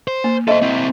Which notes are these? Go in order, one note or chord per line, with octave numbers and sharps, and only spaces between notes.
C5
A#3
A4 C5 D#5 E5
C4 E4